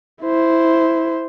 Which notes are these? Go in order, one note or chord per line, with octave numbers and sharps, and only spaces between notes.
E4 C5